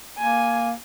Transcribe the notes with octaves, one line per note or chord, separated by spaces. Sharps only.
A#3 G#5